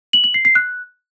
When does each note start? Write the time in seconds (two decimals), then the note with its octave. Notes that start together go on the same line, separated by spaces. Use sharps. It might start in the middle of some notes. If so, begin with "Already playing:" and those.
0.13 F#7
0.24 F#7
0.34 C7
0.45 C7
0.55 F#6